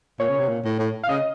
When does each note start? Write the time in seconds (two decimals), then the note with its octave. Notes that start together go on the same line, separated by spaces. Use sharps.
0.19 A#2 C#5
0.30 C#3
0.39 C3
0.48 A#2
0.64 A2
0.79 A2
1.03 F5
1.09 C#3 D#5